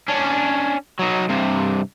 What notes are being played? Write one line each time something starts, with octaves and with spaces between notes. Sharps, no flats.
C#4 D4
F#3 D#4
G2 C3